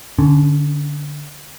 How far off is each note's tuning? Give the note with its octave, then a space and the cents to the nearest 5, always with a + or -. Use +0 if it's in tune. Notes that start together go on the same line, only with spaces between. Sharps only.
D3 +0 C#4 +25